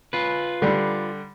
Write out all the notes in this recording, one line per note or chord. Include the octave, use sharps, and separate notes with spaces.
F4 B4
D3 G3